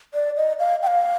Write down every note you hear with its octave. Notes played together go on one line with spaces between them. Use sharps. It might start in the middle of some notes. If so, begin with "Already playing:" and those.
D5
D#5
F5
G5
F5